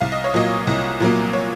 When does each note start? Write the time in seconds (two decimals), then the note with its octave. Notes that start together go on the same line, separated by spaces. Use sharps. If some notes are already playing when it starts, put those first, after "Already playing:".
0.01 C2 F5
0.12 D#5
0.24 C#5
0.34 A#2 F#3 A#3 D#5
0.67 C2
1.00 A#2 F#3 A#3
1.33 C#5